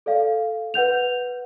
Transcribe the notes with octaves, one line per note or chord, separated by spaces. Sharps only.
A4 D5 F5
B4 F#5 G6 F7